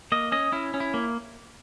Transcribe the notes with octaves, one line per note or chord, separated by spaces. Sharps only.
A#3 D#5
C#4 D#5
C#4 E4
C#4
E4
A#3